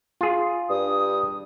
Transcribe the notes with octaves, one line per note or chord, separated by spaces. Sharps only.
F4 G#4
G2 D#6